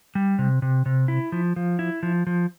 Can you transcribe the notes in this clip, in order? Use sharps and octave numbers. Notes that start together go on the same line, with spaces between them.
G3
C3
C3
C3
E4
F3
F3
E4
F3
F3